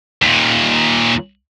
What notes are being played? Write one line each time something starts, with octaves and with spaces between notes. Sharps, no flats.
D#2 A#2